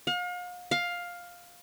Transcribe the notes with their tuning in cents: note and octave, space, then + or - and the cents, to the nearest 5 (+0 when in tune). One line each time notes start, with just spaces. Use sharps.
F5 +40
F5 +10